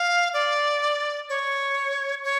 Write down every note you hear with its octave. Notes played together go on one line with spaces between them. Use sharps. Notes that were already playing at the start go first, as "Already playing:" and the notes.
Already playing: F5
D5
C#5
C#5